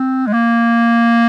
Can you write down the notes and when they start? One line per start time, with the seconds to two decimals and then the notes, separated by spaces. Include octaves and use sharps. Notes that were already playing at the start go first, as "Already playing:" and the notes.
Already playing: C4
0.27 G#3
0.33 A#3